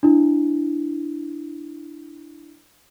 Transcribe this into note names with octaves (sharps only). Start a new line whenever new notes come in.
D4 E4